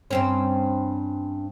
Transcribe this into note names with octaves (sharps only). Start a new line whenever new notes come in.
G2 C4 C#4